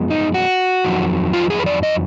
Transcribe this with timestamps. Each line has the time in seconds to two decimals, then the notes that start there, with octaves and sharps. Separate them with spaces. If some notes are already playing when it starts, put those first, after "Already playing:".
Already playing: F#2 F3 G#3 B3
0.10 D#4
0.34 F#4
0.84 F2 D#3 F#3
1.33 F4
1.50 G#4
1.59 B4
1.66 D5
1.83 D#5